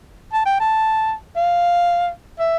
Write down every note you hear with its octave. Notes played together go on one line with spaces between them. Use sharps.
A5
G5
A5
F5
E5